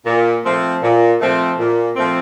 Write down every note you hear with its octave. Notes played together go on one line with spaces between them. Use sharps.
A#2
F3 A3 C4
A#2
F3 A3 C4
A#2
F3 A3 C4